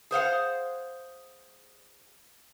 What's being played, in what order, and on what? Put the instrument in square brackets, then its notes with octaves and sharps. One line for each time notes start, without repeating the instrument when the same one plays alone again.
[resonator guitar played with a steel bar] G#4 C5 F5 F#5